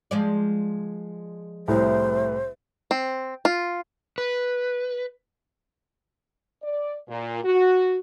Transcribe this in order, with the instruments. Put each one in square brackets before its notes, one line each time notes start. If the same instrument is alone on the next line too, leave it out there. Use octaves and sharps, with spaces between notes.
[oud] F3 G#3 D5
[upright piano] C2 A2 [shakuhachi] C5
[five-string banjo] C4
F4
[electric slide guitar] B4
[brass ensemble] D5
A#2
F#4